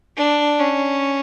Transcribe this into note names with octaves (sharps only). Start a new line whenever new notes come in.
D4
C#4